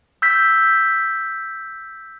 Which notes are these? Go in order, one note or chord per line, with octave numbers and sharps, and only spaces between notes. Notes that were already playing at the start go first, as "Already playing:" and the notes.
E6 G6 B6